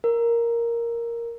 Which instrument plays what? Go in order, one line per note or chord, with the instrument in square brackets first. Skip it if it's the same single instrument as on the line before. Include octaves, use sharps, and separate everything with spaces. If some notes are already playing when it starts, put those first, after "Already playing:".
[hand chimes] A#4